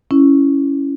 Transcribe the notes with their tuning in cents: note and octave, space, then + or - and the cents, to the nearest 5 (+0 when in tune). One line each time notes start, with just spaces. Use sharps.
C#4 +0 E4 +0